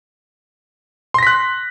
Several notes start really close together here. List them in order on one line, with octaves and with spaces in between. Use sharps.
C6 A#6 B6 F#6